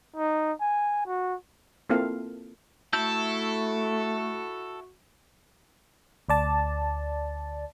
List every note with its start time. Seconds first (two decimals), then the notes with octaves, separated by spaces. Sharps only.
0.16 D#4
0.61 G#5
1.07 F#4
1.90 A#3 C4 E4 F4 A4 F5
2.93 A3 E4 F#4 A4 E6 G6
6.29 D2 D5 A5